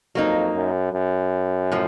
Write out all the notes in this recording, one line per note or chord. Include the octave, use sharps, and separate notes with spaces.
F2 F#3 A#3 D#4
F#2
F#2
A2 F3